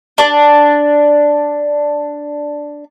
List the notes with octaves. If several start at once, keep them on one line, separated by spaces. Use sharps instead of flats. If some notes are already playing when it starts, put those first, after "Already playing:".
D4 D5